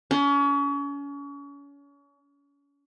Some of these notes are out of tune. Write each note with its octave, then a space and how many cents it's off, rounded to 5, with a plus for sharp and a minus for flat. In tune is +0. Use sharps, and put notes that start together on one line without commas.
C#4 +35